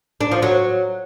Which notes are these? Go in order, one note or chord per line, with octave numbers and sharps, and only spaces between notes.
D4
F3
F#3